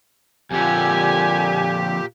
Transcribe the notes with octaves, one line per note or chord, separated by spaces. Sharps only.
F2 A#2 D3 G4 G#5